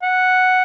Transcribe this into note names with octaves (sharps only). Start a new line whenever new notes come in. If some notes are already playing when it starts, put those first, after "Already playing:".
F#5